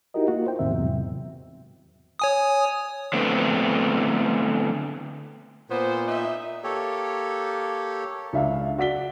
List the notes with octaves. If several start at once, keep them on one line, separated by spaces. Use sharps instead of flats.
D#4 E4 F#4 G4 A#4 D#5
A#3 F4 F#4
C5 G5
E2 A2 D#3 C4 E5
E2 G#2 C3 F#3
C#5 G#5 D#6
D3 A3 B3 C4
A#2 B3 C5
D#4 E5
A#3 G4 A4 C#5
C#2 D4 E5 F5
F#4 D5 B6 G7